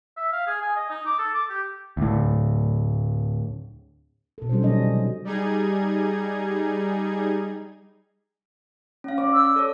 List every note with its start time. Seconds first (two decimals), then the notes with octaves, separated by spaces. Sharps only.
0.17 E5
0.32 F5
0.47 G#4
0.62 G#5
0.76 D#5
0.90 D#4
1.06 D6
1.19 A4
1.34 D6
1.50 G4
1.97 D2 A2
4.38 B2 A4
4.49 F#3 G3 C#4 F#4 A4 C5
4.62 B2 D#3 D4 D#4 F#4 D#5
4.80 C3 F#3 G#3 C4
5.25 G3 D#4 G#4 G#6
9.04 C#4 F5
9.18 D5
9.34 E6
9.56 A4 C#5